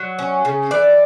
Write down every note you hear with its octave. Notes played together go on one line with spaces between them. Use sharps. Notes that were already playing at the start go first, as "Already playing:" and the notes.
Already playing: F#3
C#4
C#3
E3 D5